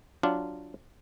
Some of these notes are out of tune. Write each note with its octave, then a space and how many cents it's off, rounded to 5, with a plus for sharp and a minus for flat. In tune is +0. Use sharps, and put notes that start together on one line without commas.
F#3 +0 D4 +0 F4 -15